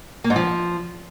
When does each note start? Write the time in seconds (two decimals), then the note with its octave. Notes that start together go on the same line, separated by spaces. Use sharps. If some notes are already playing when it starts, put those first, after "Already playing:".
0.24 A#3
0.30 G#2
0.36 F3